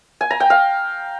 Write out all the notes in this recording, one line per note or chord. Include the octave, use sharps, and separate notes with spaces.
G#5
A#5
G5
F5